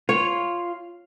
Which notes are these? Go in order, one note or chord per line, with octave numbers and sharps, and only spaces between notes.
F4 C#5